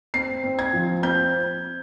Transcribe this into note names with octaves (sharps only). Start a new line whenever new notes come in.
C4 C7
C4
G#6
F3
C4 G6